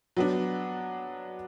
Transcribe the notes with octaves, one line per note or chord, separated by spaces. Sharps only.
F#3 B3 D4